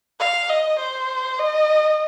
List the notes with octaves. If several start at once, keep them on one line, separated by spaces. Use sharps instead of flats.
F5
D#5
C5
D#5